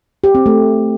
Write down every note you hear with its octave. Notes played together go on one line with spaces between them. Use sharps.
G4
C4
A3